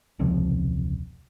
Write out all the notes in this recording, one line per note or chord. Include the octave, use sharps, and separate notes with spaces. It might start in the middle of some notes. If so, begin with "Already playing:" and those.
E1 C#2 C3 F3